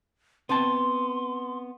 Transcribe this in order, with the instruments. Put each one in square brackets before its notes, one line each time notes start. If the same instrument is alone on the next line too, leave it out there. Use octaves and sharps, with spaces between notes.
[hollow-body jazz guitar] B3 C4 A5 [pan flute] C6